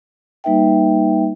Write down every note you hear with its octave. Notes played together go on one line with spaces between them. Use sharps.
G3 A#3 D#4 B4 E5 G5